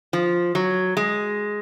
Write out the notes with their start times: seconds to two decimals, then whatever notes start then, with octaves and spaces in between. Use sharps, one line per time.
0.13 F3
0.55 F#3
0.97 G#3